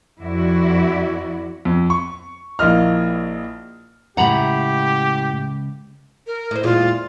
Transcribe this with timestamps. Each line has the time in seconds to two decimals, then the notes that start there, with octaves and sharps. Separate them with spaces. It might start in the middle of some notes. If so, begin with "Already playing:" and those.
0.19 F2 E4 F#4 D5
1.65 F2
1.90 C#6
2.59 A#1 A#3 E4 D#5 F6
4.17 C#2 A2 G4 F#5 A#5 B5
6.27 A#4
6.51 A2 C5
6.63 E2 A#2 G#3 F4